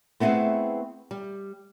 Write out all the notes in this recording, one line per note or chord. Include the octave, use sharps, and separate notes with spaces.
A3 B3 C4 E4 G#4 B4
G3